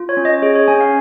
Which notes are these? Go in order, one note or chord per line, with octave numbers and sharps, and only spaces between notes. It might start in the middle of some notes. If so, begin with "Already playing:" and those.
Already playing: F4
C#5
C#4
D#5
G#4 C#5
C#5
C#4 G#5
F5